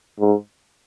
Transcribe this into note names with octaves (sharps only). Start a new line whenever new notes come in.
G#2